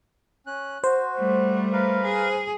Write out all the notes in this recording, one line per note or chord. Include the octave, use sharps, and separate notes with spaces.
C#4 F#6
F#4 C5
G3 A3
A#4 B4 F5
G#4